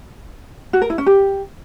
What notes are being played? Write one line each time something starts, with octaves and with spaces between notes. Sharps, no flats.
F#4
A#4
E4
C#4
G4